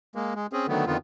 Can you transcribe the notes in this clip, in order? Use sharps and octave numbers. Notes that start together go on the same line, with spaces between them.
G#3 A#3
G#3
C4 C#4 G#4
D3 D#3 F#3 A3 B3
F2 D3 D#3 B3 F4